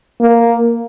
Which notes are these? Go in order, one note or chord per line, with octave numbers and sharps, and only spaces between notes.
A#3